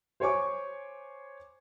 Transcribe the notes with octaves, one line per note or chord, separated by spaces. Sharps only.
C5 C#5 G#5 C#6 D6